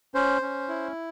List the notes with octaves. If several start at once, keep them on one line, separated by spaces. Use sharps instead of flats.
C#4 C5
C#4
E4